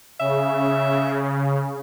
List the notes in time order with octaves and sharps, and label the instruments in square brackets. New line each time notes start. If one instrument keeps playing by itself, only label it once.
[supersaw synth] C#3 [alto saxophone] E5